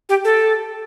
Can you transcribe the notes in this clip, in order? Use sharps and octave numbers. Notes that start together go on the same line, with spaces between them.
G4
A4